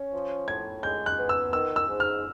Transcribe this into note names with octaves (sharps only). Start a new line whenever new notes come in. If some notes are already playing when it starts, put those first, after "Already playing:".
Already playing: C#4
F3
A2 G#6
G#3 G6
F#6
B3
E6
D#3 E6
E6
G#2
F6